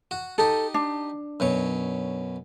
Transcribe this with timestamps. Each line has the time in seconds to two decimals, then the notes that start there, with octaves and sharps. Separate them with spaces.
0.11 F#4
0.38 D#4 G4 A4
0.74 D4
1.40 F#2 B2 C#5